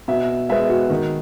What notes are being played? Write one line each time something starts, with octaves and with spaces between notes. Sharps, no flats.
B2 E5
G#3 B3 E5
F#4
D#3